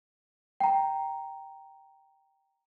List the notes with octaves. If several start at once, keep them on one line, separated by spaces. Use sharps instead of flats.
G5 A#5